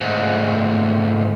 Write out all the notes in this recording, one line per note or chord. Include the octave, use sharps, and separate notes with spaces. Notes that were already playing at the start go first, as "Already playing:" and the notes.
D2 G#2